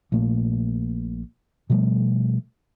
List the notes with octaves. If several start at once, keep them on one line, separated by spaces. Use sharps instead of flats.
A#1 A#2 A3 A#3
B2 F3 G3 A3